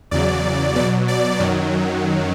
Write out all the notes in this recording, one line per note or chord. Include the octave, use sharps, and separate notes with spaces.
E2 C#3 F#3 D5
B2 F#3 D5
D5
F#2 D#3 F#3